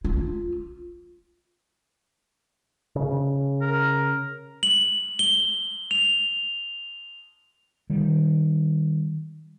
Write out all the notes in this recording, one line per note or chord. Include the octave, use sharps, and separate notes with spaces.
F4
C#3
A#4
F#7
G7
F7
D#3 G3